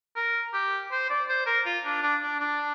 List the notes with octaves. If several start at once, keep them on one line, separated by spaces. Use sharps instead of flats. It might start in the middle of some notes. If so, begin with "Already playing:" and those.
A#4
G4
C5
D5
C5
A#4
F4
D4
D4
D4
D4